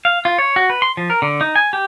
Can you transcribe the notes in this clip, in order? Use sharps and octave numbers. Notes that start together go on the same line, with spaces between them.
F5
F4
C#5
F#4
B4
C6
F3
A#4
D3
D#4
G#5
G4